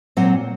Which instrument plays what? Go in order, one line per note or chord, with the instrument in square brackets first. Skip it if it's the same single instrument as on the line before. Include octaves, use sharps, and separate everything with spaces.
[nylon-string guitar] A#2 F#3 C4 F#5